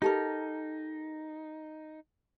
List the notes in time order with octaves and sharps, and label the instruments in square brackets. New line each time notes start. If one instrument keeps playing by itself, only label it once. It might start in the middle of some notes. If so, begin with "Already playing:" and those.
[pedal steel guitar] D#4 [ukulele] G4 A4 A#4